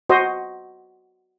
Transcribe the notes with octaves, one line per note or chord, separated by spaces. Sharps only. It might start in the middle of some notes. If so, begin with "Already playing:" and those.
F#4 C5 D#5